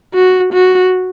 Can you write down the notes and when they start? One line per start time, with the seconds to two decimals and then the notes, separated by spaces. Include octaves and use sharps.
0.15 F#4
0.53 F#4